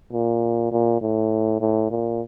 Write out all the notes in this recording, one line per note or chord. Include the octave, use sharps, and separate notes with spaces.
A#2
A#2
A2
A2
A#2